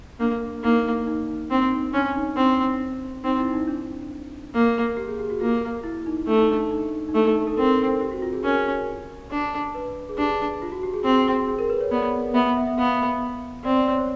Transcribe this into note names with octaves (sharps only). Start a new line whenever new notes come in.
A#3 D4
A#3 D#4
D#4
C4 D4
D#4
C#4 D4
D#4
C4 D4
C4 D#4
E4
D#4
D4
A#3
G4
G#4
G4
F#4
A#3 F4
E4
D#4
A3 D4
D#4
D4
D#4
D#4
A3 D4
D#4
D#4
A4
C4 A#4
G4
F#4
F4
G#4
C#4 A#4
D4
B4
G#4
D4 G4
F4
F#4
G4
G#4
C4 G#4
G#4
A#4
B4
C#5
B3 D5
B3 E5
E5
E5
B3 F5
C4 D5
D5
C#5
C5